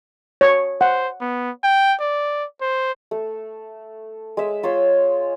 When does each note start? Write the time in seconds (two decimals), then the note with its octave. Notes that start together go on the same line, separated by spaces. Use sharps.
0.41 C#5
0.81 C5 F#5
1.21 B3
1.63 G5
2.00 D5
2.61 C5
3.11 A3 A4
4.37 G#3 E5
4.63 F4 C#5 C6 E6